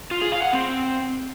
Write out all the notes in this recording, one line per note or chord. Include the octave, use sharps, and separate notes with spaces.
F4
G#4
F5
F#5
C4